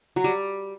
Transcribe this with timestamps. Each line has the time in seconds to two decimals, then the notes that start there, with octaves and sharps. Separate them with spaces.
0.16 F#3
0.24 G3